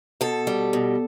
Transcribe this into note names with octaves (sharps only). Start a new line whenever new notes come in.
B2 A4
G3
B2